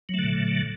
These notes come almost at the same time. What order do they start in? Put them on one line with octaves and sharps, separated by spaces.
F#3 A3 D3 A#2